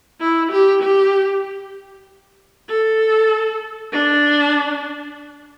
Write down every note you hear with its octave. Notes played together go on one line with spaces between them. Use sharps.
E4
G4
G4
A4
D4